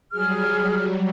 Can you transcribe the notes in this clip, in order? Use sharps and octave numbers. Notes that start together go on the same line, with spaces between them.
F#3 G3 G#4 F6